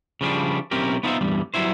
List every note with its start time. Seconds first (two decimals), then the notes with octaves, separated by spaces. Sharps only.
0.21 C#3 F3 G3 D4
0.71 B1 C4 C#4 E4 G4 A#4
1.03 B3 D#4 F4 A#4 C5 E5
1.21 E2 G2 G3
1.54 F#3 G3 B3 E4 C5